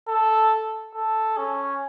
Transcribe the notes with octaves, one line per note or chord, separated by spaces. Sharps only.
A4
A4
C#4